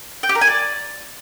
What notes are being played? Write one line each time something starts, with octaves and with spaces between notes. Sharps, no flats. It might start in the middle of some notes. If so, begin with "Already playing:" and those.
G5
G4
A#4
G#5
D5